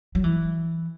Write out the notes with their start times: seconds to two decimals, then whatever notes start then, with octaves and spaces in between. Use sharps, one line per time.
0.15 F#3
0.24 E3